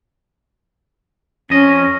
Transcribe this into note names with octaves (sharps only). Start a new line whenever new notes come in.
F2 C#4 D#5